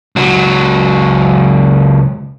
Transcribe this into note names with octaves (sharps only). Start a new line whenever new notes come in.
C#2 F#3